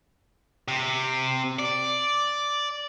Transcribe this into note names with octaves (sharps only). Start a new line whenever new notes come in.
C3
D5